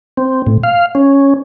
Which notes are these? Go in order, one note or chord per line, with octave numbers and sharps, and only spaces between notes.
C4
A2
F5
C#4